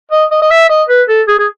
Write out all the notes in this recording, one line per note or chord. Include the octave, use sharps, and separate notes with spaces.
D#5
D#5
D#5
E5
D#5
B4
A4
G#4
G#4